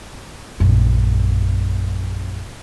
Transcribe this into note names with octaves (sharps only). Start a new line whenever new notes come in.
A#1 F#2